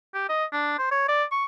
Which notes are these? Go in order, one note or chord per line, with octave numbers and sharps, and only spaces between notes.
G4
D#5
D4
C5
C#5
D5
C#6